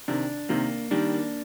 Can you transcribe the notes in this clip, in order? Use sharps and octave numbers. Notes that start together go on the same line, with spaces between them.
C3 D#3 D4
C3 D#3 A#3
D#3 G3 D4